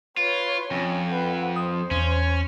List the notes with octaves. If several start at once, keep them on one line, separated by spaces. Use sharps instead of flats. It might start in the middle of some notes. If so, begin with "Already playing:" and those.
F4 B4 C#5
F2 C#4
B4 F#5
C5 D#6
E2 C#4